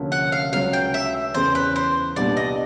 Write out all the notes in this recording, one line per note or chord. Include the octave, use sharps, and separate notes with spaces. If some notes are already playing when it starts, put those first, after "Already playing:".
Already playing: D2 C3 F3 A#3 C#4
F#5
F5
C#2 C#3 F#3 F5
G5
E5
E2 C#3 E3 C5
B4
C5
C2 A#2 G3 B3 D4 D5
D#5